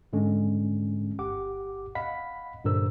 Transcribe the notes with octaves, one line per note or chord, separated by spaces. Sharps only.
G#2 D3 G#3 C#4
G1 G4 F#5 D6
D#5 F5 F#5 B5 B6
G2 A#2 D3 A#4 C5 E6